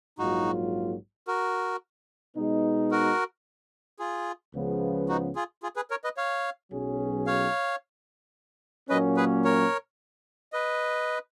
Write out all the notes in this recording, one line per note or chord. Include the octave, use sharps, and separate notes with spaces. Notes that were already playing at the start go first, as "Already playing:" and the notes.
A#1 G#2 F#3 A#3 D#4 F4 F#4
F#4 A#4
B2 G#3 B3 D#4
F#4 A#4
F4 G#4
C#2 C#3 F3 B3
D#4 F#4
F4 G#4
F4 G#4
G#4 B4
A#4 C#5
B4 D#5
C#5 F5
B1 B2 F#3 C#4 G#4
C#5 F5
A#2 F#3 A#3 C#4 B4 D#5
G#4 B4
A#4 C#5
B4 D#5